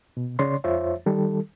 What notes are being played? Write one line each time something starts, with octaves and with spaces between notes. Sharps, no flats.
B2
C#3 C#5 D5 C6
F2 F4 C5 C#5 E5
D#3 G3 A4